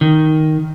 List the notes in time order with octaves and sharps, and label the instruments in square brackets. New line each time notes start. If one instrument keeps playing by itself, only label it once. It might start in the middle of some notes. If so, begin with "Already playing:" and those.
[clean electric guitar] D#3